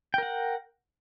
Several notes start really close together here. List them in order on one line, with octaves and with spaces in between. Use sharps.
G5 A#4 F#5